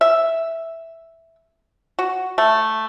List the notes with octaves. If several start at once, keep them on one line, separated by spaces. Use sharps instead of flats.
E5
F#4
A3